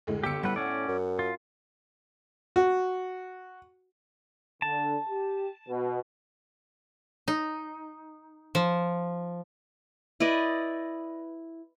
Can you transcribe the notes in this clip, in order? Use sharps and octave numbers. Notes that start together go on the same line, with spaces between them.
D2 A2 G#3
G1 G4 E6 C#7
A2 G3 B4 F#5
C#4 D5
F#2
F4
F#4
D3 A5
G4
B2
D#4
F3
E4 B4 D5 D#5